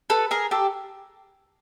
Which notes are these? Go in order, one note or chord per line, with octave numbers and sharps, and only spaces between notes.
A4 B4
G#4 A#4
G4 A4